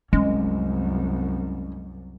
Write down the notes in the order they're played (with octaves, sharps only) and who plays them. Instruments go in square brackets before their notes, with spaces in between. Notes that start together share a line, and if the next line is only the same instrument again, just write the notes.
[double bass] C2 F#2 [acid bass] G#3 [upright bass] C#4